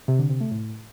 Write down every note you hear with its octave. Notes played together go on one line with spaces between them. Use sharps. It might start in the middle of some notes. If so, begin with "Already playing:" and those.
C3
D3
C3
A3
A2